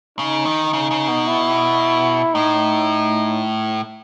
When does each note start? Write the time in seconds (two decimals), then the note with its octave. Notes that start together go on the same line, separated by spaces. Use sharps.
0.18 C#3 D#4
0.45 D#3
0.73 C#3
0.91 C#3
1.08 B2
1.27 E4
2.34 A2 D#4